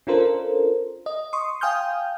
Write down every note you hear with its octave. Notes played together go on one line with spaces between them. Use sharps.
C#4 D4 F4 A4 A#4 C5
D#5
C6 C#6 D#6
F5 G5 G#5 D#6 F6 G6